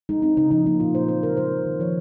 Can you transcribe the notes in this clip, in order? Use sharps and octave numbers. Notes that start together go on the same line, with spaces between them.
G#3 D#4
C4 D#4
C#3 D#4
F3 D#4
A#3 D#4
A#2 F4
F#3 C5
C4 C5
C#3 A#4
G#3 C5
C4
D#3
F3 C#5